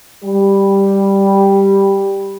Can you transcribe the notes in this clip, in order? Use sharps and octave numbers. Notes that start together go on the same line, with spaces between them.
G3 G4